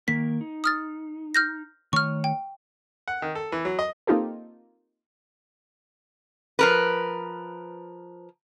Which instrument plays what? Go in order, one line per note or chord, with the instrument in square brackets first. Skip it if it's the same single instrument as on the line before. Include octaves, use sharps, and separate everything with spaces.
[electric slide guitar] D#3 A#3 A#4 [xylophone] B6
[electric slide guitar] D#4
[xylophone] D#6 F6 A6
F6 G6 A#6
[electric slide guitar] D#3 A3 C#5 [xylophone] C#6 F6
[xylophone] G5
[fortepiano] F#5
D#3
A4
E3
F#3
D#5
[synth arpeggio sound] A#3 C4 D#4 F4 G4 A4
[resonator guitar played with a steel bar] F3 A#4 B4